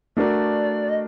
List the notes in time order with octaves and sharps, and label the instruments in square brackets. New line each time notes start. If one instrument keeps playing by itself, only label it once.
[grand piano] A3 D4 F#4 A#4 [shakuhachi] D5
[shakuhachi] D#5